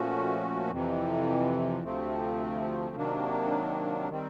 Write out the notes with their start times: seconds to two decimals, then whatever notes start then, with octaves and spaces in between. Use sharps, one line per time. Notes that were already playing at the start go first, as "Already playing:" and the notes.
Already playing: A#2 F3 A3 C#4 F#4
0.71 F2 C3 E3
1.83 D2 C3 F3 A3 C4
2.96 C3 D#3 F#3 A#3 D4
4.09 D#3 G3 C4